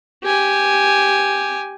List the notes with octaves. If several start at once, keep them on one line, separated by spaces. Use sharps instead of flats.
G4 G#5